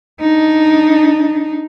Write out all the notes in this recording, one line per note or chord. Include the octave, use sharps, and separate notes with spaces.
D4 D#4